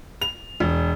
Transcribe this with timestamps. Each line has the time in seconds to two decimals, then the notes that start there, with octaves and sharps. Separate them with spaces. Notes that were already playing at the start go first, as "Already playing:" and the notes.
0.22 F7
0.60 E1